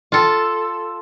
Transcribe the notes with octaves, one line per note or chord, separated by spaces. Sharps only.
F4 A4